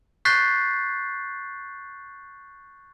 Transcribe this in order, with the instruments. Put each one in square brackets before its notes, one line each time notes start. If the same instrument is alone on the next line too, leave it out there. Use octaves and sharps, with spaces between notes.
[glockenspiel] C#6 F#6 G6 A6 B6 C7